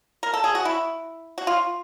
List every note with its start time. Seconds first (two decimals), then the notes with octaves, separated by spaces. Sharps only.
0.23 A#4
0.34 A4
0.44 G#4
0.55 F#4
0.65 E4
1.38 F#4
1.47 F4